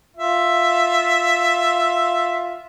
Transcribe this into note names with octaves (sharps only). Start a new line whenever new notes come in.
F4 E5